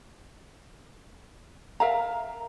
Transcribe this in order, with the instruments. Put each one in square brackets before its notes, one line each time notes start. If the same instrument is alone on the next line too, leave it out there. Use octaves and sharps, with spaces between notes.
[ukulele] A#4 E5 F5 A#5